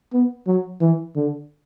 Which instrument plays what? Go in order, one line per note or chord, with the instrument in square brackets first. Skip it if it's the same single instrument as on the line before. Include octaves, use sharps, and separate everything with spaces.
[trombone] B3
F#3
E3
D3